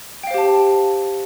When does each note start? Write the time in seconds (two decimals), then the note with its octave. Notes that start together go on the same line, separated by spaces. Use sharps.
0.23 G5
0.27 F5
0.31 C5
0.34 G4
0.38 A5